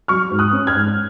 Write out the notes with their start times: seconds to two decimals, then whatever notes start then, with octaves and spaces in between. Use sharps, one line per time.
0.08 F#3 C#6 F6
0.31 G#2
0.39 D#6 F#6
0.53 C#4
0.67 F6 G#6
0.75 G#2